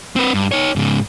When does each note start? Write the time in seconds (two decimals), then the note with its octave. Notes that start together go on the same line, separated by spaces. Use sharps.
0.16 C4 B4
0.34 G2
0.52 D#4 C#5
0.76 G#2 C#3